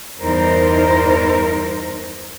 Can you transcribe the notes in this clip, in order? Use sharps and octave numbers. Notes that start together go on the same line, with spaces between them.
E2 G2 D#4 A#4 C5